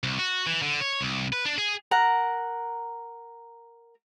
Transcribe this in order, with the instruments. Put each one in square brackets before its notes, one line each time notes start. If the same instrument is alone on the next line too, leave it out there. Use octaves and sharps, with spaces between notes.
[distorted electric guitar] C2
F#4
E3
D3
C#5
C2
B4
D4
G#4
[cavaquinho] A#4 F#5 A#5